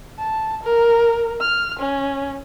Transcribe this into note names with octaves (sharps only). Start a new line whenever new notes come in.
A5
A#4
F6
C#4